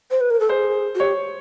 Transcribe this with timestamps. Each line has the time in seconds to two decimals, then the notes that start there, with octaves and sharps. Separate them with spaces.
0.11 C5
0.21 B4
0.30 A#4
0.40 A4
0.49 G#4 C5
0.95 F#4
1.00 G4 C#5